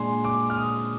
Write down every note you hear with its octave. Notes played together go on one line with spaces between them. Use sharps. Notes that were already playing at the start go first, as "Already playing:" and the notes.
Already playing: A#2 G#3 D4 G#5 C6
D6
F6
D#6